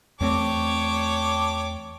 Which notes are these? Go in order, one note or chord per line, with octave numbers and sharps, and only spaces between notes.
E2 A3 C4 D4 G4 C#5 D6